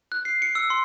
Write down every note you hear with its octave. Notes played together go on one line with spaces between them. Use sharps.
F#6
C7
C#7
E6
C6